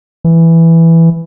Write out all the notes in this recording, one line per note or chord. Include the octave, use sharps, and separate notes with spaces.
E3